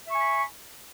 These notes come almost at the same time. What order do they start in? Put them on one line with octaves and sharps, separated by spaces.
E5 C#6 G#5 B5